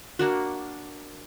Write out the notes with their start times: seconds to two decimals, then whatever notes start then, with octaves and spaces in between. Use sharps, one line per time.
0.19 A#3 D4 F#4